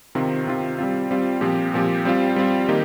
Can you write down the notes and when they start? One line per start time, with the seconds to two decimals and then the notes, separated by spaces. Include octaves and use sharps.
0.15 C3 D#3 C4 F4
0.47 C3 D#3 C4 F4
0.79 G3 C4 F4
1.11 G3 C4 F4
1.41 A#2 F3 C4 G4
1.74 A#2 F3 C4 G4
2.05 G3 C4 F4
2.36 G3 C4 F4
2.69 D#3 A#3 D#4 G4